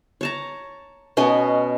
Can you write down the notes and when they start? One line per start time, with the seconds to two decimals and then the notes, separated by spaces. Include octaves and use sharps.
0.21 C#5 A5 A#5
1.17 B2 B3 C#4 D#5